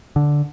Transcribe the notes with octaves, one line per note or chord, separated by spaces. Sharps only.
D3